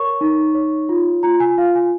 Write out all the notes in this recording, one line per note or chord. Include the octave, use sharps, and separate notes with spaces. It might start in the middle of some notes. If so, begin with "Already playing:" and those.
Already playing: A#4 C#5 C#6
D#4
C#5
F4
F4 A#5
G#5
F4 F5
G#5